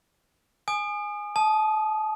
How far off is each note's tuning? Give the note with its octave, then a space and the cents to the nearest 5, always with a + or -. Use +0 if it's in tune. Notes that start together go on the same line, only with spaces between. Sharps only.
G#5 +0 D#6 -30
A5 -30 D#6 +0